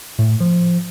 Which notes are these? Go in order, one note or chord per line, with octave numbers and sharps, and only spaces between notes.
A2
F3